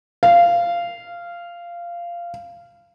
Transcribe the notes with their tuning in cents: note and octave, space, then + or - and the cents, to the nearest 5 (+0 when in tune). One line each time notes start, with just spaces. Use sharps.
F5 -15